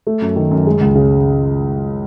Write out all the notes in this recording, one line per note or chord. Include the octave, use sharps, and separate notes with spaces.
A3
F#2
D#3
F#2
G#3
C#2
C#3